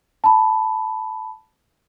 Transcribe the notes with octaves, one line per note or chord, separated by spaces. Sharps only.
A5 B5